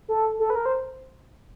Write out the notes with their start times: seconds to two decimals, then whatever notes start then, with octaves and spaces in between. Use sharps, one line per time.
0.09 A4
0.39 A4
0.50 B4
0.56 A#4
0.66 C5